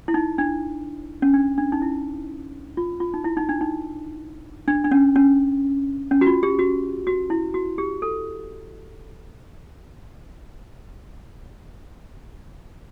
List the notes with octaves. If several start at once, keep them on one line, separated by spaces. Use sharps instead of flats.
E4
D#4
D4
C#4
D4
D4
D#4
E4
F4
F4
D#4
E4
D#4
D4
D#4
D4
D4
C#4
C#4
C#4
F#4
F4
G4
F#4
F#4
E4
F#4
G4
A4